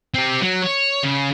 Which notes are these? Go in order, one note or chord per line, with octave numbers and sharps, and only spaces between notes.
C4 G4
F#3
C#5
C#3